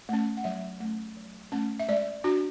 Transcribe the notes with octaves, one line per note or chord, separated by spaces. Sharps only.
A3 C#4
F#5
F#3 E5
A3 C#4
F#3
A3 C#4
E5
G#3 D5
D4 F#4